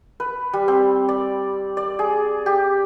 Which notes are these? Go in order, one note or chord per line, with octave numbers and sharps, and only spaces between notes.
B4
G3
C4
D5
D5
G#4
G4